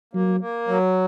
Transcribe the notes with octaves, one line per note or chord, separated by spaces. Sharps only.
F#3 A#3
A#3
F#3